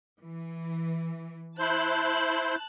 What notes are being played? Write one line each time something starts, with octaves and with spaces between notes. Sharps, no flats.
E3
E4 C5 A5 F#6 G6